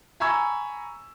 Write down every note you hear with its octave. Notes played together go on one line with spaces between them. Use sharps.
G#5 A#5 B5 C#6 E6 G#6